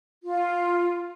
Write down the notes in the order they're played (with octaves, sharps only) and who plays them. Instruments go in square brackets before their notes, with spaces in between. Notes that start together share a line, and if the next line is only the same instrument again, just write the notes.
[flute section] F4